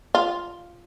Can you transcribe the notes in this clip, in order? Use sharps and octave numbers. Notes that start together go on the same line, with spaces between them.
F4